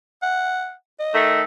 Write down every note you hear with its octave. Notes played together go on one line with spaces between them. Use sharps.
F#5
D#5
D#3 A3